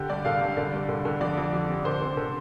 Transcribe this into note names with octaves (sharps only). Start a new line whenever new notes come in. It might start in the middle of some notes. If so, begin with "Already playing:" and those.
Already playing: D3 G4
G2 D5
D3 F5
G2
D3 D5
G2
D3
D3
F2 D5
F2
F2
C3
D3 C5
D3
D3